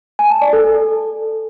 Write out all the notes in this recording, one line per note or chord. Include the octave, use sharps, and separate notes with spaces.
G#5
A5
D5
A4
A4